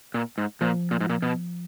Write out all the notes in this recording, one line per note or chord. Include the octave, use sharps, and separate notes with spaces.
A#2
G#2
A#2 F3
A#2
G#2
A#2
B2